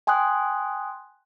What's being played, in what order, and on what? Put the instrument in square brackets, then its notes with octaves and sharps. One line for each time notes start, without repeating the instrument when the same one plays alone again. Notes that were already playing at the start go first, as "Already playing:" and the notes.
[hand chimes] G5 G#5 C6 D#6 F#6